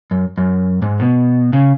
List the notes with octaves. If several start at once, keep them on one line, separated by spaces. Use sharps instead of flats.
F#2
F#2
G#2
B2
C#3